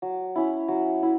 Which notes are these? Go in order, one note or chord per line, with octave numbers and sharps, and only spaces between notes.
F#3
C#4 E4
F#3
E4